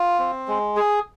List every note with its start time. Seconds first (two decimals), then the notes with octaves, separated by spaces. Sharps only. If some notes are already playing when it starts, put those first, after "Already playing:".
Already playing: F4
0.19 C4
0.48 G#3
0.76 G#4